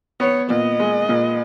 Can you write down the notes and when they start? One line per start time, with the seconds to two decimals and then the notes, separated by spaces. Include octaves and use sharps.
0.20 B3 C#5
0.50 A#2 D#5
0.80 G#3
1.09 A#2